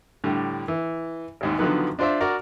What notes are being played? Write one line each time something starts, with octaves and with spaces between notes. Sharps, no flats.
A2 D3 G3
E3
A1 D#2 G#2
D3 D#3 F3 F#3 B3
D4 F4 C5 D5 E5
F#4 A#4 D5